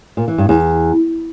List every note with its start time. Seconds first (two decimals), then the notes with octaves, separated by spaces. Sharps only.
0.17 A#2
0.28 E3
0.38 G2
0.49 E2